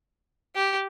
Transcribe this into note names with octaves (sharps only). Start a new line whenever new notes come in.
G4